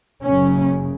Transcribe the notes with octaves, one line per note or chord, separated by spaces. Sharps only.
F#1 F#2 C#3 C#4